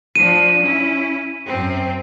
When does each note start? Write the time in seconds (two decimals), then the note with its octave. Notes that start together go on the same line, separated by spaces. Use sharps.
0.16 F3 D4 D#7
0.61 C#4 E4
1.47 F#2 C4